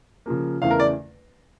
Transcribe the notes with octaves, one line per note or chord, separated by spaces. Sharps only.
C#3 F3 A#3
E2 C#3 E3 A3 F5
A#4
D5